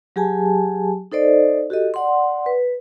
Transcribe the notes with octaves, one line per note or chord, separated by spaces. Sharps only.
F#3 G4 G#4 G#5 A5
D#4 A4 C5 D5 D#5
F#4 G4 A4 D#5
D5 F#5 C6
B4